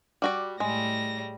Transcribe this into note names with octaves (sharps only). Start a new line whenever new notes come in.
G3 F#4 D5
A2 G3 G#3 A#6